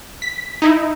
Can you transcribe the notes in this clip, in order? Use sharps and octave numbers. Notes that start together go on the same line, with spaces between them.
B6
D#4 E4